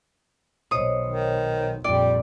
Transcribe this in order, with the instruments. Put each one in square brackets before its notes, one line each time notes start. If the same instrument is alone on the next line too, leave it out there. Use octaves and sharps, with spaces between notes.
[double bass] B1 [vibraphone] C5 C#5 D#5 [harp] D#6
[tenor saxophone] D#3
[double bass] A#1 F2 [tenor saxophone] G3 [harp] D5 [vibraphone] G5